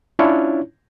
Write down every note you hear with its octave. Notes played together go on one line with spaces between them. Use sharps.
C#4 D4 E4 F4 C#5